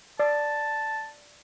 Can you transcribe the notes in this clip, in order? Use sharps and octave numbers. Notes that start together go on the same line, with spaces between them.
D5 A5